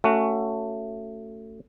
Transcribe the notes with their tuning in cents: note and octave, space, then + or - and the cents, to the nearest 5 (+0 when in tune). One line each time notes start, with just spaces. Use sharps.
A3 +15 C#4 +10 F#4 +0